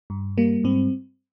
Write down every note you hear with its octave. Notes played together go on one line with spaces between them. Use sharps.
G2
G3 A#3
G#2 C4